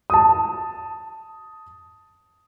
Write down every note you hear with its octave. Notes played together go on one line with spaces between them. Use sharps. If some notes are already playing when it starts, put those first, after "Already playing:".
A5 D#6